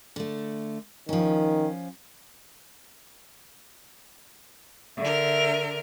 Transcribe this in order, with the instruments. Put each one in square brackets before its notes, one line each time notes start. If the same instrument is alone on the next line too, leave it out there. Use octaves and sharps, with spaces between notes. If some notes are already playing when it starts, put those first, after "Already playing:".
[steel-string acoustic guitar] D3 A3
[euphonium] D#3 [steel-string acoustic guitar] F3 C#4
[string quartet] D3 A#4 [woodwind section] E5